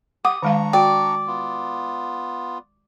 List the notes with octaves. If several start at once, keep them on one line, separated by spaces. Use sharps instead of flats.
G4 F#5 D6 D#6
D#3 G#3 D4 F5 A#5 C#6
F#4 D5 G5
B3 F4